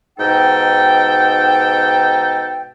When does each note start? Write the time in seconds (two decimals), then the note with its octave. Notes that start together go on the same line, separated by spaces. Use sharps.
0.18 G#2 B2 D#4 A4 G5